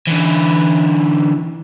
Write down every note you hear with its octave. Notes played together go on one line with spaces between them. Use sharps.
D3 E3